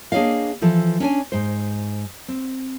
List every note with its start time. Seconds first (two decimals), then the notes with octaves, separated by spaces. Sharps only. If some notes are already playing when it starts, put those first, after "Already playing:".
0.12 A#3 D4 G#4 C#5 D#5 F5
0.62 E3 F3 A4
1.00 C#4 D4 C#5 G#5
1.32 G#2 C5
2.28 C4